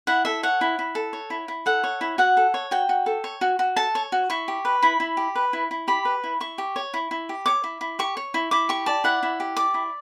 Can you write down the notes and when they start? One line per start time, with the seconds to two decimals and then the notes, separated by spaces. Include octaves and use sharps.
0.07 E4 F#5
0.25 A4 E5
0.43 C#5 F#5
0.61 E4
0.79 E4
0.95 A4
1.13 C#5
1.30 E4
1.48 E4
1.66 A4 F#5
1.84 C#5
2.01 E4
2.18 F#4 F#5
2.37 A4
2.54 C#5
2.71 F#4 G5
2.89 F#4
3.06 A4
3.24 C#5
3.41 F#4
3.59 F#4
3.76 A4 A5
3.95 C#5
4.12 F#4
4.30 E4 C#6
4.48 G4
4.65 B4
4.82 E4 B5
5.00 E4
5.17 G4
5.35 B4
5.53 E4
5.71 E4
5.88 G4 B5
6.05 B4
6.24 E4
6.40 E4 C#6
6.58 G4
6.76 C#5
6.94 E4
7.11 E4
7.29 G4
7.46 C#5 D6
7.64 E4
7.81 E4
7.99 G4 C#6
8.17 C#5
8.34 E4
8.51 E4 D6
8.69 G4 C#6
8.86 D5 A5
9.04 E4 F#5
9.23 E4
9.40 G4
9.56 D5 D6
9.74 E4